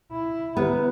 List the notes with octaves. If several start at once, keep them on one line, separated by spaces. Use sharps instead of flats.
E4
D3 B3 G4 A#5